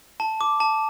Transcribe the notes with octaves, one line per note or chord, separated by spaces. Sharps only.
A5
D6
A5